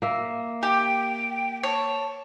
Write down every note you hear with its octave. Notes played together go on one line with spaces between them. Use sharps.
A#3 E5
G4 G5
C#5 A5